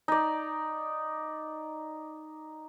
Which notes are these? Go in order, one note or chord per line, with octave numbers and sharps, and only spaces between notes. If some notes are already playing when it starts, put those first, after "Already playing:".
D#4 D5